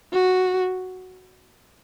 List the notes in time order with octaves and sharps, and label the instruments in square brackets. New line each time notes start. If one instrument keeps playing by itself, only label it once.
[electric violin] F#4